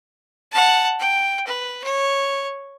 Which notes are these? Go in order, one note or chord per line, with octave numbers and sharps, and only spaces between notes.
F#5 A5
G5
B4
C#5